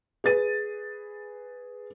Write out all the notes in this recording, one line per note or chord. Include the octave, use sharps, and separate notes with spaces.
G#4 B4 A6 D#7